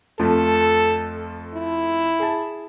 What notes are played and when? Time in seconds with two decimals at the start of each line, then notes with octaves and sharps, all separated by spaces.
0.19 F2 F3 A3 A4
1.55 E4
2.19 G#4 A5